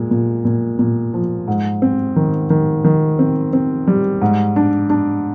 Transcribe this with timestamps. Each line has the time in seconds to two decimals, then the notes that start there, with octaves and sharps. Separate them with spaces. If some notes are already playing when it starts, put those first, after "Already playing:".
Already playing: A#2 G#3
0.11 A#2
0.45 A#2
0.79 A#2
1.14 F3
1.48 G#2
1.82 C4
2.16 D#3
2.50 D#3
2.84 D#3
3.19 C4
3.53 C4
3.87 G3
4.22 G#2
4.56 D4
4.90 D4